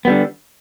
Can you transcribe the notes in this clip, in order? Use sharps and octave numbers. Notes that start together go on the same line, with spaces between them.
D3 G3 B3